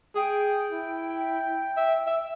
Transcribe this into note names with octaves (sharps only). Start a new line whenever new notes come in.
G#4 G5
E4
E5
E5